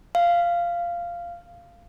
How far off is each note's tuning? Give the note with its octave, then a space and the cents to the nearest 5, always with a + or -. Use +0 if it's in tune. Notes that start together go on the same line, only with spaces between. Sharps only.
F5 -10